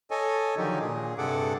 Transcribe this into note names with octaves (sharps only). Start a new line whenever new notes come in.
A4 C#5 D#5 G#5
D3 D#3 F3 F#3 D#4 G4
A#2 G#4
G2 C3 G#4 A4 F#5 D6